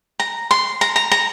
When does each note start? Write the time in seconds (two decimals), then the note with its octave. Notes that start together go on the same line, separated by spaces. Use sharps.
0.20 A#5
0.51 C6
0.81 A#5
0.96 A#5
1.12 A#5